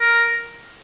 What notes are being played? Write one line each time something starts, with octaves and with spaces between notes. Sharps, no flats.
A#4